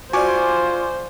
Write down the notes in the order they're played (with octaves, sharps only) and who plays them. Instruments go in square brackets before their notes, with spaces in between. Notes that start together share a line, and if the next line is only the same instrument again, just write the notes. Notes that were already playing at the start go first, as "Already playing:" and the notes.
[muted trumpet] F4 [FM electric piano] F#4 D5 [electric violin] C5 [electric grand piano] G#5 C#6 D6